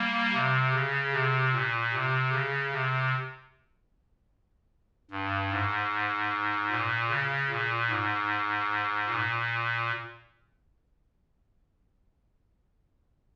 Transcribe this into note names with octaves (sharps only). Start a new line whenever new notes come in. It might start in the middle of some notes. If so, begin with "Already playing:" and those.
Already playing: G3 A#3
C3
C#3
C3
A#2
C3
C#3
C3
G2
G#2
A#2
C#3
A#2
G#2
A#2